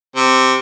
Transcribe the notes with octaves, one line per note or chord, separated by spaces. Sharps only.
C3